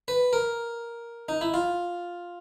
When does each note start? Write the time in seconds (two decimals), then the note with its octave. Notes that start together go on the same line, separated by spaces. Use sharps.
0.08 B4
0.33 A#4
1.29 D#4
1.41 E4
1.54 F4